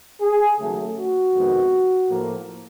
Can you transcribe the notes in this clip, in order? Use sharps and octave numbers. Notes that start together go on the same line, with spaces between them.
G#4
D#2 C#3 F#3 A3
F#4
F2 C3 D#3 G#3 B3
A2 F3 A#3